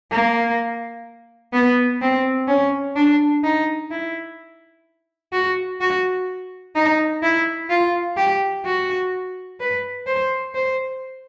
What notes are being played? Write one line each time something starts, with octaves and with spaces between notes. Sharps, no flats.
A#3
B3
C4
C#4
D4
D#4
E4
F#4
F#4
D#4
E4
F4
G4
F#4
B4
C5
C5